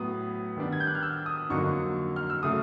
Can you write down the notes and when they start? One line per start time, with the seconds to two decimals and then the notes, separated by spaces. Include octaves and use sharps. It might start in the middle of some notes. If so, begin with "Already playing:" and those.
Already playing: A2 F#3 B3 D#6
0.57 D#3 G3 B3 D4
0.73 G#6
0.80 G6
0.87 F#6
0.95 F6
1.03 E6
1.26 D#6
1.50 F2 D3 F#3 A#3 D#4 C#6
2.16 F6
2.30 E6
2.43 C#3 F#3 A3 D#6